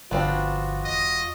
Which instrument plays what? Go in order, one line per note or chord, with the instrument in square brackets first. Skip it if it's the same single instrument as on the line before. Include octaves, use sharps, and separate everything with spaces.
[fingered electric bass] G1 D3 F3 [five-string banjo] B3 C4 D4 [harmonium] F4 F#4
[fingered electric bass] E1 [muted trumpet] D#5